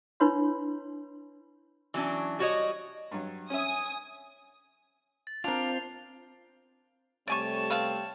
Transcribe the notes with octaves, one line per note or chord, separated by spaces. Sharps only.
D4 E4 B4 C#5 B5 C6
E3 F#3 C#4 D4
G3 F#4 C#5 D#5
G2 F#3
C#4 E5 G#5 D#6
A6
C4 D4 F4 A#4 F7
C3 G3 A3 C#5 D5 G#5 A5 C#6
B3 C4 F5